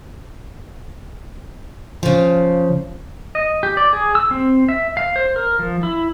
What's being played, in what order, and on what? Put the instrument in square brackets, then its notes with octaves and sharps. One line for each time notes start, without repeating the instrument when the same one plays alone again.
[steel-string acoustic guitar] C#3 F3
[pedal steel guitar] D#5
G4
D5
G#4
E6
C4
E5
F5
C5
A#4
F3
E4